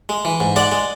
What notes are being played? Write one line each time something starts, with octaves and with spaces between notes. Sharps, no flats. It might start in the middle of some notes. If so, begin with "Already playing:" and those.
G#3
E3
G#2
G#3 D5 F#5
G#3